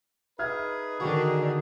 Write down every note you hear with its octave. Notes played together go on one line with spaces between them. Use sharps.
D#4 G#4 B4 E5 F6 G#6
D3 D#3 D4 D#4 F#4 G#4 C#6